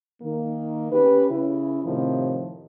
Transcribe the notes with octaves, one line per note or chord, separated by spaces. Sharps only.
D#3 A#3
C#4 G4 B4
C#3 E4
A2 C3 D#3 F3